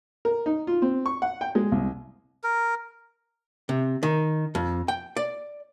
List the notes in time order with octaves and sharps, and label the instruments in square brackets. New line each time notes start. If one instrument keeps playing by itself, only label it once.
[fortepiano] A#4
D#4
F4
C4
C#6
F#5
G5
G#3
C2
[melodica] A#4
[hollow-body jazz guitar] C3
D#3
F2
G5
D5